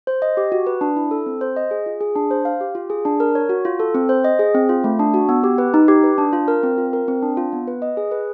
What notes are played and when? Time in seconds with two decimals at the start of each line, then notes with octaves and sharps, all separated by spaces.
0.07 C5
0.22 D#5
0.37 G4
0.52 F#4
0.67 B4
0.81 D4
0.96 E4
1.11 A4
1.26 C4
1.41 C5
1.56 D#5
1.71 G#4
1.86 F4
2.01 G#4
2.16 D4
2.31 C5
2.45 F5
2.61 G4
2.75 F4
2.90 G#4
3.05 D4
3.20 A#4
3.35 C#5
3.49 F#4
3.65 F4
3.80 A4
3.95 C4
4.09 C5
4.24 D#5
4.39 G#4
4.54 C4
4.69 F4
4.84 A3
4.99 D4
5.14 F#4
5.29 B3
5.44 G4
5.58 B4
5.74 D#4
5.88 G4
6.04 B4
6.18 D4
6.33 F4
6.48 A#4
6.63 C4
6.78 F4
6.93 A#4
7.08 C4
7.23 D4
7.37 F4
7.53 B3
7.67 B4
7.82 D#5
7.97 G#4
8.11 B4